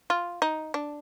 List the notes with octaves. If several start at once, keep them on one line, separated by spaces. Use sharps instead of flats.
F4
D#4
D4